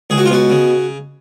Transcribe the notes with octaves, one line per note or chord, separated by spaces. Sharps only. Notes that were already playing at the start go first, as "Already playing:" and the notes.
C#2 G#4
F#4
F4
B2 F#4
C#3